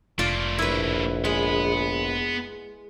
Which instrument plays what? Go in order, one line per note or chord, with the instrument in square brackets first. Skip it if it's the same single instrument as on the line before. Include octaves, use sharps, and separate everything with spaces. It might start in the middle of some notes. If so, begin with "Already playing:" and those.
[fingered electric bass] F1 [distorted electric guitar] A3 A#3 [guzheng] F4 D5
[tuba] A#1 [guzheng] E4 B4
[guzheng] G#3 [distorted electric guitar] B3 B5